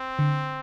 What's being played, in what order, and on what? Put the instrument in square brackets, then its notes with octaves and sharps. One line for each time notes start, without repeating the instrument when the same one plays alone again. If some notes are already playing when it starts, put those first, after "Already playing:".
Already playing: [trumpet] C4
[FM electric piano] D3